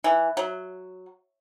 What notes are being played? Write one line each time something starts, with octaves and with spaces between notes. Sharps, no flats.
E3
F#3